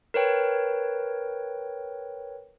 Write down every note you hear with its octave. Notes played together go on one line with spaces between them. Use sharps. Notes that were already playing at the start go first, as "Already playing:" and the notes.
A#4 B4 C#5 G5